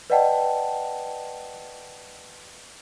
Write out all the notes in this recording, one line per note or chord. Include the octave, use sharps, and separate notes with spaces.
B4 D5 D#5 F#5 G5 A5